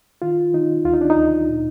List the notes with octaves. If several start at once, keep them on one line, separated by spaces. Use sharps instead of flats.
D#3 F4
D#3 D#4
D2 F4
D#4
D4
D#4
D2
A#2